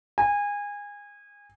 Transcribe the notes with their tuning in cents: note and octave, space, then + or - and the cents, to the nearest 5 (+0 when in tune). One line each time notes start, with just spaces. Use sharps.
G#5 -25